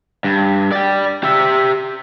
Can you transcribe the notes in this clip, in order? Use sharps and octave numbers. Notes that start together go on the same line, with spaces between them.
G2
D5 G5
G4 E5